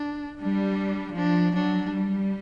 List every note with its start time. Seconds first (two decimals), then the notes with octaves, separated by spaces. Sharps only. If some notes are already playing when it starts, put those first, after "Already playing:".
Already playing: D4
0.42 G3 D4
1.16 F3 D4
1.54 F#3 D4
1.93 G3